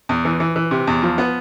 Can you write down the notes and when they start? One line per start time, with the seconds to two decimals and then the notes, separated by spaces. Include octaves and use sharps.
0.09 E2
0.25 E3
0.40 E3
0.56 E3
0.71 C3
0.87 E2
1.03 F3
1.18 B3